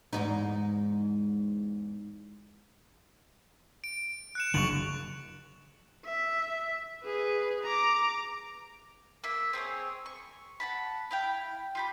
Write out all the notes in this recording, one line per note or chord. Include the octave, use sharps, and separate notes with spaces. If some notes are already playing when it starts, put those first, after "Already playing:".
E2 G#2 D#4
D7
F#6 C#7 E7
F#1 D3 C#6 F7 F#7
E5
G#4 B4
A#5 D6
A#3 E5
C4 G#4 A4 C#5
C#6
F#5 A5 B5
E4 F5 G5
F4 G4 B5